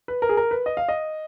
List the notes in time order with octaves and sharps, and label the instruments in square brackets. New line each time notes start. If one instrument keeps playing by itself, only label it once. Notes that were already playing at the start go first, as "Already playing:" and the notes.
[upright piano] B4
A#4
G#4
A#4
B4
D#5
F5
D#5